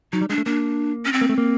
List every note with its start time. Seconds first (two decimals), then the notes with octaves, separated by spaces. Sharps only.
0.13 F#3 D#4
0.21 G3
0.30 G#3 D4
0.38 A3
0.46 A#3 D4
1.05 C#4
1.13 C4
1.21 A#3
1.29 A3
1.38 A#3